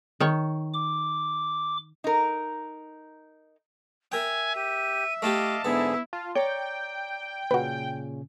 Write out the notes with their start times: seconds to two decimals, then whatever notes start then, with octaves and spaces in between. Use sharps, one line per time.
0.20 D#3 C#5
0.74 D6
2.04 D#4 A#4
4.12 A#4 E5 G5 G#5
4.56 G4 D#7
5.22 A3 E4 G4 D#5 F5 A5 D6
5.65 G#2 D3 B3 E4 G#4 E5
6.13 F4 A5
6.35 C#5 D5 G5 A#5 D6
7.51 A#2 C#3 C#4 F#4 B4